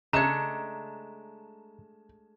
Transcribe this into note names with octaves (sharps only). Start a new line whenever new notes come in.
C#3 G#3 A3 D4 A#5 G#6 C#7 E7